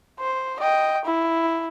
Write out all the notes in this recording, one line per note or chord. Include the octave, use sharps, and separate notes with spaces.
C5
D#5 G5
E4